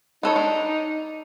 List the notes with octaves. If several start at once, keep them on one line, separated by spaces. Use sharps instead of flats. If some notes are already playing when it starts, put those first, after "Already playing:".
B3 D#4 A4 C#5
D4